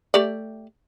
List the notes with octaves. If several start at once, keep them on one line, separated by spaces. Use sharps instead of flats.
A3 G4 D5